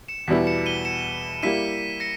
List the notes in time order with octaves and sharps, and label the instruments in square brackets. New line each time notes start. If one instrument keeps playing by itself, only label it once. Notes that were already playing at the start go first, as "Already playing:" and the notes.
[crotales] C#7 E7
[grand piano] E2 B2 G3 B3 E4 [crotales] B6
[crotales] C#7 E7
D#7 G7
C#7 E7
[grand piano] G3 A#3 E4 [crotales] B6 D#7
[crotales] A#6 C#7